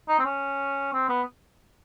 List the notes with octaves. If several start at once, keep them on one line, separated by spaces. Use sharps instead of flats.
D#4
C4
C#4
C4
B3